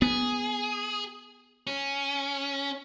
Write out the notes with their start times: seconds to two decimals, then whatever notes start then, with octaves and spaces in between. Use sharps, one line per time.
0.02 B3 G#4
1.67 C#4